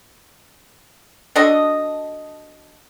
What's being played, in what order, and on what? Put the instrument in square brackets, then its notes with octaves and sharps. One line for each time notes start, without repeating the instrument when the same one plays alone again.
[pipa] D4 F#4 A4 D#5